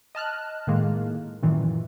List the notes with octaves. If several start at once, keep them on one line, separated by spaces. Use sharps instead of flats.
D#5 A5 F6 F#6
A2 D#3 G#3 A#3
F#2 A#2 D#3 E3